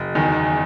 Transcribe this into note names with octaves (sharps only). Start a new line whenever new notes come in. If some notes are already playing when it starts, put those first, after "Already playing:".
Already playing: F#1
E2 D#3